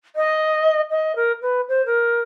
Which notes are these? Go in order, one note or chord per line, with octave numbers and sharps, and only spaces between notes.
D#5
D#5
A#4
B4
C5
A#4